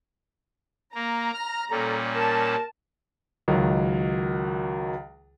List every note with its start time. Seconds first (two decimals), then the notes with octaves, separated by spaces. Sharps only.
0.95 A#3 A#5
1.34 F6
1.71 A#2 G3 C#4 A4
2.14 A#4 A5
3.48 C#2 D#3 F#3